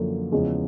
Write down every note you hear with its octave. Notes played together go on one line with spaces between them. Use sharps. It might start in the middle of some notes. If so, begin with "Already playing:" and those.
Already playing: F#2 D3 F3 A#3
E2 C#3 F3 G#3 C#4